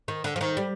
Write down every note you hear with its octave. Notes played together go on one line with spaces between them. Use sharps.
D#3
D3
F3
D#3
G3